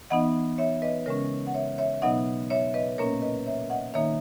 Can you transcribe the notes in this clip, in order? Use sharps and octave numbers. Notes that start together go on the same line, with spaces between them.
E3 B3 D#4 D#5 F#5
C#5 E5
B4 D#5
C#3 G#3 C#4 A#4 C#5
F#5
C#5 E5
C#5 E5
B2 F#3 B3 D#4 D#5 F#5
C#5 E5
B4 D#5
A#2 A#3 C#4 A#4 C#5
B4 D#5
C#5 E5
D#5 F#5
D#3 A#3 D#4 C#5 E5